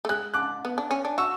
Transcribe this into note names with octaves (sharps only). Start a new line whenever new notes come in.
A3
G#3 F#6
D6 F#6
B3
D4
C#4
D4
F#4 C#6 E6